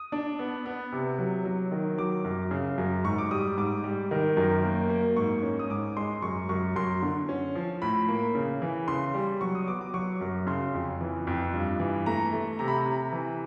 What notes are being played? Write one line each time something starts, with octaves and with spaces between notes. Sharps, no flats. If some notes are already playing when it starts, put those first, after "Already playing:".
Already playing: D#6
D4
B3
B3
C3
F#3
F#3
D#3
F#3 D6
F#2
C#3
F#2
G#2 C#6
D6
G3 D#6
G#2 D6
G3
D#3
F#2
A#3
A#3
G#2 C#6
C#4
D#6
G#2 D6
G#3 C6
F#2 C#6
F#2 C#6
F#2 C6
D3
C#4
F3
A2 B5
A#3
C#3
E3
C#3 C6
G3
F#3 C#6
D#6
B3 D6
D6
F#3 C#6
F#2
C#3 C6
F2
E3
F2
G2
E3
A3 A#5
A3
C3 A#5
B5
A#5
C3
E3